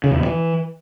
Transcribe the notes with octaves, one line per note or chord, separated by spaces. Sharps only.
C#3
E2
B2
E3